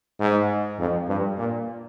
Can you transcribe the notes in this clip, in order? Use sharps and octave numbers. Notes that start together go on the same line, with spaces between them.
G#2
F2
G2
A#2